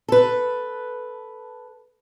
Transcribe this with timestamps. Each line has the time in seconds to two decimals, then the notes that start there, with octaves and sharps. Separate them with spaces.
0.08 A4 B4